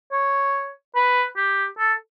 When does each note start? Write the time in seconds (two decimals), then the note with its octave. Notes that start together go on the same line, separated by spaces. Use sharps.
0.12 C#5
0.95 B4
1.36 G4
1.78 A4